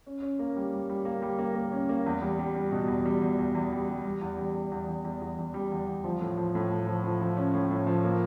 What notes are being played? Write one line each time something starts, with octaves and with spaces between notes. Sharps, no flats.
C#4
C#4
A#3
G3
G3
G3
A#3
G3
A#3
A#3
C#4
A#3
E2
G3
G3
G3
B2
E2
G3
E2
E2
E2
G3
G3
G3
E2
G3
E2
E2
E2
E2
E2
E2
G3
E2
E2
F3
A2
F3
A2
A3
F3
F3
F3
C#4
A2
A2
F3
A#3